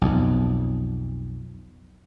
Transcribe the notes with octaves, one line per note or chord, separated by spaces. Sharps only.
B1 F2